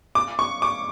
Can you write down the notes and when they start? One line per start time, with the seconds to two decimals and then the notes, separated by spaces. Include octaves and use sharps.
0.15 D6
0.39 C#6
0.62 D6